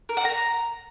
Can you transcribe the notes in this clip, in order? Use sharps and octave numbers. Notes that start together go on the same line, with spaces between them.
A#4
F#5
A#5